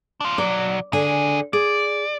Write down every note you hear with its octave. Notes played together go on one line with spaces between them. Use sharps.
D4 F4
B1 F#3 D5
C#2 D3 G#4 G#5
G#4 D5